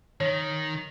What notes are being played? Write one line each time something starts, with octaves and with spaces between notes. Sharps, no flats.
D#3 C#5